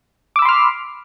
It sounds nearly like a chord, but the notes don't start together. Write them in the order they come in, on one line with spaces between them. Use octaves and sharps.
D6 E6 B5 C6 F6